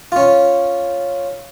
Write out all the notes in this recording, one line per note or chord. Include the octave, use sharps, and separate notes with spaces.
C#4 F4